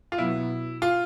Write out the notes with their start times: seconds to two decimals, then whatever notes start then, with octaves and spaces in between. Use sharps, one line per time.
0.12 F4
0.18 B2 F#3 B3 E4
0.82 F4